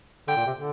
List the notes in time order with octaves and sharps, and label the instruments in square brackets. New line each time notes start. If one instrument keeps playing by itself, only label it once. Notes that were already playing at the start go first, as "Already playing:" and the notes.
[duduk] D3 [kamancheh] G5
[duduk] A#2
C3
D3